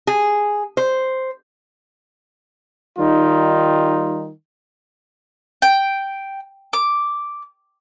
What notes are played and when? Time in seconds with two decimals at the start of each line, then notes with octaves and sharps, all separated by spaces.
0.07 G#4
0.77 C5
2.99 D#3 G3 D#4 F4
5.62 G5
6.73 D6